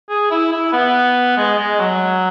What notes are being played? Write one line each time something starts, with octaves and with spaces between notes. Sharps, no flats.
G#4
E4
E4
B3
G#3
G#3
F#3